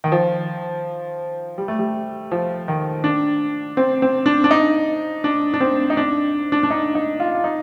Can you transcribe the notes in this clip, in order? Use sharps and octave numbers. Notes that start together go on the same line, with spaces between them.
D#3
F3
G3
A3
G3
F3
D#3
D4
C4
C4
D4
D4
D#4
D4
D4
C4
D#4
D4
D4
D4
D#4
D#4
F4
F4
D#4